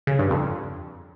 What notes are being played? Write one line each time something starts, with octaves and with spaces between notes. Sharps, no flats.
C#3
G2
F2